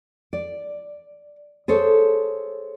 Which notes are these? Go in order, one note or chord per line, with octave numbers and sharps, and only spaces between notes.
D5
G#4 A4 C5 C#5